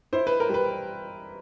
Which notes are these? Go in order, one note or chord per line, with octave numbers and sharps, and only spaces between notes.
E4 C5
B4
A#4
G3
B4